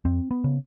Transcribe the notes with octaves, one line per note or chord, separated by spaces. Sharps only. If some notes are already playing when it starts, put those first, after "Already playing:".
F2 C4
B3
C#3